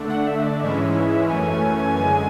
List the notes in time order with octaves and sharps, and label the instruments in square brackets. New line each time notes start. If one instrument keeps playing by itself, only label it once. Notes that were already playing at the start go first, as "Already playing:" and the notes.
Already playing: [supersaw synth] D3 A3 D4
[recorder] F#5
E5
E5
D5
[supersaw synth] G#2 E3 G#3 C#4 E4 [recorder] E5
[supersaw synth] F#2 E3 A3 C#4 [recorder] G#5
[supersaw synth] F#2 D3 G#3